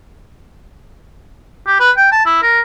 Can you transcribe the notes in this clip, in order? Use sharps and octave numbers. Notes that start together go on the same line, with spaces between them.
G4
B4
G5
A5
E4
A#4